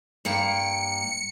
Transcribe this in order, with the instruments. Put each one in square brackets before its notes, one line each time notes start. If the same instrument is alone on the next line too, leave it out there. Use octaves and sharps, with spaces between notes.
[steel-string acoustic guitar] G2 A#3 G5 [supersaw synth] C#7